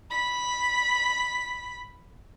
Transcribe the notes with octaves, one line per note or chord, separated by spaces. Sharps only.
B5 B6